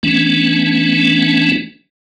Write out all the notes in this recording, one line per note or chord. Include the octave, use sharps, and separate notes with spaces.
E3 A3 B3 C#4 D4